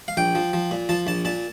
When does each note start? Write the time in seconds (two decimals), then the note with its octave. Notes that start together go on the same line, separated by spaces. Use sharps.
0.08 F5
0.17 A#1 G5
0.35 F3
0.53 F3
0.71 A#2
0.89 F3 A5
1.07 A#1 A5
1.25 A#2 A5